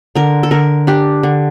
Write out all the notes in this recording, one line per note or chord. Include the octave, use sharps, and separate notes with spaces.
D3 A#4
A4
D3 A#4
D4 G4
D3